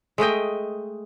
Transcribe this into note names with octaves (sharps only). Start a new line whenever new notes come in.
G#3 A3 D#5 G5